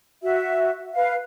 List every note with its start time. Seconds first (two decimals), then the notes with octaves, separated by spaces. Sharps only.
0.22 F#4 E5
0.94 B4 F5